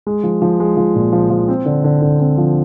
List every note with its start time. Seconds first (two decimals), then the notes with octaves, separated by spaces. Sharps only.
0.07 G#3
0.23 F3
0.42 F3
0.60 G#3
0.77 F3
0.95 A#2
1.12 F3
1.30 F3
1.48 C4
1.66 D3
1.84 D3
2.02 D3
2.19 C4
2.38 F3